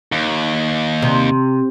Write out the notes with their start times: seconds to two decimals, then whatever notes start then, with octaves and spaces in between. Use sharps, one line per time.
0.12 D#2
1.02 C3